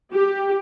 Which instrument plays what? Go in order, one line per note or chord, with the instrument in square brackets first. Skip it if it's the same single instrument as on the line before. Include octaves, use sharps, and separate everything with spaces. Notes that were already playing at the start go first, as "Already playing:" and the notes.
[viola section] G4